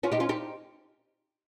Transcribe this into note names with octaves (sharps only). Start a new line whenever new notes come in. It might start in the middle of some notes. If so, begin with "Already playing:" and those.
C#4 F4
D#4 G4
C#4 F4
D#4 G4